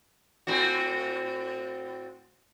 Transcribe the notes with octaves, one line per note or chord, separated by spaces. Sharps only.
A2 C4 F#4